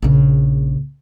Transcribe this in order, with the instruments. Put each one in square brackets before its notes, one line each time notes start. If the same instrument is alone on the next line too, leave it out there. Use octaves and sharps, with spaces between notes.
[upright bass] A#1 C#3